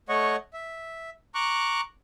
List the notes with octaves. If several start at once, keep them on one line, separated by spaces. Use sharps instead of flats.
A3 C#5 D#5 F#5 C#6
E5
A#5 C#6 D6 F#6